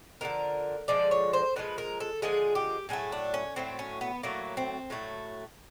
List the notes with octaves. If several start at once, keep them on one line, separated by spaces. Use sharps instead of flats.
D3 F3 G#3 A#4
D3 F3 G#3 D5
C#5
C5
D3 F3 G#3 B4
A#4
A4
D3 F3 G#3 G#4
G4
A2 F#3 A3 G#4
D4
C#4
A2 F#3 A3 C4
C#4
B3
A2 F#3 A3 A#3
C4
A2 F#3 A3